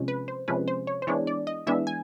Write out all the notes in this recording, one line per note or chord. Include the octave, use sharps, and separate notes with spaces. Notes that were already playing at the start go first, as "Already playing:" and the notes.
Already playing: C3 F3 G#3 C#4
B4
C5
C3 F3 G#3 C#4 B4
C5
C#5
C5
E3 G#3 B3 D4 C#5
D5
D#5
E3 G#3 B3 D4 E5
G#5